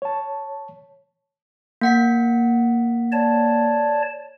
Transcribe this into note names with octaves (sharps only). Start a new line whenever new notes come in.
C#5 A5
A#3 F#5 B6
C#5 D5 A5